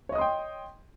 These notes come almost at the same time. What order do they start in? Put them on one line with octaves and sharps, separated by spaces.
C#5 D#5 D#6 C6 G5